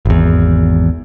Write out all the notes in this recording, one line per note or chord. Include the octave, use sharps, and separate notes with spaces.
G#1 E2